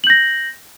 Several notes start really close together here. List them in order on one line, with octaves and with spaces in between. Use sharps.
F#7 G6 A#6